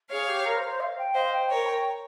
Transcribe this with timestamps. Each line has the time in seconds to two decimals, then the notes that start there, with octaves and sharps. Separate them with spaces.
0.10 G#4 C#5 F5
0.28 G4
0.45 A#4
0.57 C5
0.69 C5
0.80 F5
0.98 G5
1.14 C5 D#5 F5
1.32 G5
1.49 A#4 C#5 C#6
1.66 G5